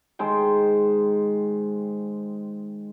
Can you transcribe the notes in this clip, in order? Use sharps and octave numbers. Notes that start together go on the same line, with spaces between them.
D#3 G#3 C5 G5